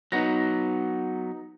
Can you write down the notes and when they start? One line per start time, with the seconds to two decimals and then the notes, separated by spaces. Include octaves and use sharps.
0.12 F#3 B3 D#4 F#5 A#6